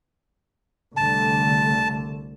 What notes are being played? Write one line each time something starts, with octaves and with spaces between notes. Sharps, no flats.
C2 D3 A3 A5